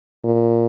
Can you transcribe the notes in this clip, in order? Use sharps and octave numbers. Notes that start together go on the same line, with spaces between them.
A#2